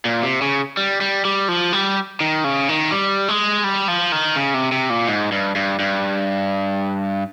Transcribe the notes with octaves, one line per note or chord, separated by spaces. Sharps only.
A#2
C3
C#3
G3
G3
G3
F3
G3
D#3
C#3
D#3
G3
G#3
G3
F3
D#3
C#3
C3
C3
A#2
G#2
G2
G2
G2